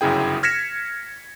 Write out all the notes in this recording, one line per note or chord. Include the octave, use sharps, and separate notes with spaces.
G1 F#2 C#3 E4 G#4 G5
F6 G#6 A#6 B6 C#7 E7